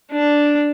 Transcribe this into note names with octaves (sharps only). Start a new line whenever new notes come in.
D4